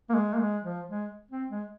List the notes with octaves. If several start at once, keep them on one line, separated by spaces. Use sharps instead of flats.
A#3
G#3
A#3
G#3
F3
G#3
C4
G#3